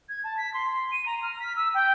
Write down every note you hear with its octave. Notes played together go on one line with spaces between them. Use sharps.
G#6
A5
B6
C6
C6
D#7
A#5
F6
B6
E6
G5